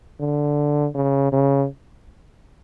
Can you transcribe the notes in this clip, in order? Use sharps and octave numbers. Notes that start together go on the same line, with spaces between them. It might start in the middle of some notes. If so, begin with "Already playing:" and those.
D3
C#3
C#3